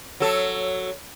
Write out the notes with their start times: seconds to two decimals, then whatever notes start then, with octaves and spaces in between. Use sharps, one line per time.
0.20 F#3 A4